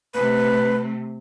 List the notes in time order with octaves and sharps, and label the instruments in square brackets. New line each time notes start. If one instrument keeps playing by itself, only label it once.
[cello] C3 A3 [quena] B4